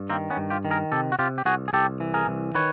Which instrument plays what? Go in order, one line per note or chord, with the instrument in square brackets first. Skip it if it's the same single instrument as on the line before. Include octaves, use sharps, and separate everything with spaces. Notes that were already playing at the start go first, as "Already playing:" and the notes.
Already playing: [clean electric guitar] G2
D#3 A#3 C4
B3 C#4
G2
F4 G4
D#3
G#4 A#4
C3 G4 A4
F#4
C3 F4 G4
G4
C2 F#4 G#4
G#4
C2 G4 A4
E3
G#4 A#4
C2
D#3 B4 C#5